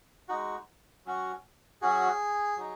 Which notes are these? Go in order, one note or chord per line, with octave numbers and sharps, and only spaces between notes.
G#3 D#4 F#4
F#3 C#4 F#4
F#3 C#4 F#4 G#4
F#3 D#4